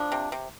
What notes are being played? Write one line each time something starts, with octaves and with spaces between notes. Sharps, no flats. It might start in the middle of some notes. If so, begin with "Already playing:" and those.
Already playing: F3 D4
C3
C3